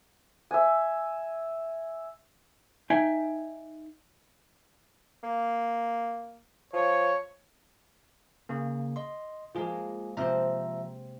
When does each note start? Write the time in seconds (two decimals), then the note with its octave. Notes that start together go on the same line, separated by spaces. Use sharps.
0.51 E5 G#5
2.90 D#4 E5 G5 G#5
5.23 A#3
6.73 F3 C#5
8.49 C#3 A#3
8.96 D#5 C6
9.55 F3 G#3 A#3 F4 G#4
10.17 C3 F3 C4 C5 E5 A#5